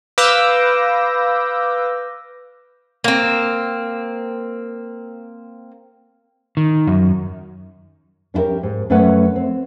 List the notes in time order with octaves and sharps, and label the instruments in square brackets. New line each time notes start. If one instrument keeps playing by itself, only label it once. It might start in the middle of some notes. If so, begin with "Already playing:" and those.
[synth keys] B4 F5 D6 E6 G6 A#6
[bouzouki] A#3 C4
[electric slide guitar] D#3
F#2
[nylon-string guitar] C#4 D4 E4 G4 A#4
G#2
F#2 A3 C#4 A4 B4 F#5
C4